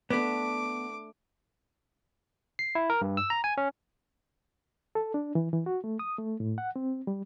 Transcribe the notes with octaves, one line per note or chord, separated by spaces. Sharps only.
A3 B3 D4 D6
C7
E4
A#4
G2
E6
A#5
G#5
C#4
A4
D4
E3
E3
F#4
A3
D#6
A3
A2
F#5
C4
G3